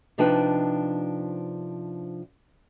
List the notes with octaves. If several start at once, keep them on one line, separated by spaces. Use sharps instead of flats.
C3 F3 D4 D#4 B4 G5